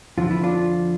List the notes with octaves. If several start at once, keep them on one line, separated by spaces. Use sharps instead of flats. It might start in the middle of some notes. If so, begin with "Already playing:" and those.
F2 D3 F3 F4
E4
D4 F4